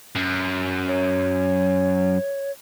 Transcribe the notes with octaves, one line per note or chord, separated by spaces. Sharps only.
F#2
C#5